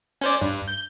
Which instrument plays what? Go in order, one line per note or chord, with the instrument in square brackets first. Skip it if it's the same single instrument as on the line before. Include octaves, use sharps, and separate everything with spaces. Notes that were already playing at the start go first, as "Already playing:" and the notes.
[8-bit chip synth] C#4 C5 D5
G2
G6